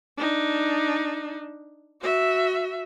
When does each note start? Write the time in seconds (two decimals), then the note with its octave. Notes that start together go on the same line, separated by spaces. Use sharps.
0.18 D4 D#4
2.01 F#4 E5